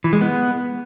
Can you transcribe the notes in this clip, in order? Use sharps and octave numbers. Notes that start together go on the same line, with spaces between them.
E3
G#3
B3